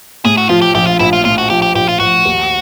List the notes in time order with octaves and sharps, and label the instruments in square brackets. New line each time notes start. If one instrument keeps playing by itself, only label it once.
[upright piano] A2 [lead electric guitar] G#4
[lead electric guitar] F#4
[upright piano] F3 [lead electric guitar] F4
[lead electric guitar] G4
[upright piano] A#1 [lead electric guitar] G4
[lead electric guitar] F4
[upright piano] A#1 [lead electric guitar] E4
[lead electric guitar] F4
[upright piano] A2 [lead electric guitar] F4
[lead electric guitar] F#4
[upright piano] F3 [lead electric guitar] G4
[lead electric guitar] G4
[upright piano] A#1 [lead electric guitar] G4
[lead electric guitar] F4
[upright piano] A#1 [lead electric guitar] F#4
[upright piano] D#2